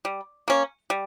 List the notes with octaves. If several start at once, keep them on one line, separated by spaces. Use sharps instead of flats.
G3
A#3 C#4
G3